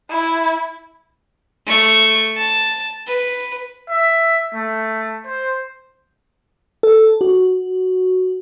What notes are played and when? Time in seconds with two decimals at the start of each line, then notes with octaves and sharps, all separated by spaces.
0.10 E4
1.67 A3 C#6
2.37 A5
3.07 B4
3.90 E5
4.55 A3
5.27 C5
6.83 A4
7.21 F#4